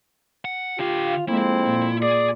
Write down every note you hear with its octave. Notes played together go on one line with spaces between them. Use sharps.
F#5
D3 F4 G4 F5
F2 G#3 A#3 C4 E4
A#2
G#4 D5